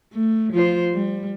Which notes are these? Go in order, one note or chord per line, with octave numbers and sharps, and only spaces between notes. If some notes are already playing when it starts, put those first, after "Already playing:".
A3
F3 F4 C5
G3